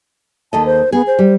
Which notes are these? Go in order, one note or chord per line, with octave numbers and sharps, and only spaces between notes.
D#2 A4 D#5 A5
C5
B3 G#4
C5
G3